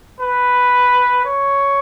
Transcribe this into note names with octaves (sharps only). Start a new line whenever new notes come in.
B4
C#5